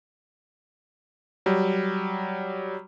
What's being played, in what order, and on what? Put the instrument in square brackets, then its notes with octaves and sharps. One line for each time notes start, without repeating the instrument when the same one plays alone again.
[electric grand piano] F#3 G3